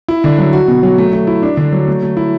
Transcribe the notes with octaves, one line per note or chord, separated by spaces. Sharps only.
E4
D3
F#3
F#4
B2
F#3
A3
A3
E4
D4
D3
F#3
A3
A3
E4